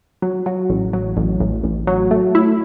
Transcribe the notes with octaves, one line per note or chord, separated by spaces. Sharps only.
F#3
F#3
A1
F#3
A1
A1
A1
F#3
A3
E4